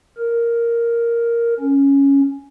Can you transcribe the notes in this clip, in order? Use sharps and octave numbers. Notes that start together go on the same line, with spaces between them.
A#4
C#4